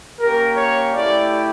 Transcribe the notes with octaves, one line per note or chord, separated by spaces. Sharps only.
A#3 C#4 G4 A#4
C#5
A3 E4 G4 D5